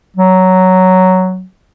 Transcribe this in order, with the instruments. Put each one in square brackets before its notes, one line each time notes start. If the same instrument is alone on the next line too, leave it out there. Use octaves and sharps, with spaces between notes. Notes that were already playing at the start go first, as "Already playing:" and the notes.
[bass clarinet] F#3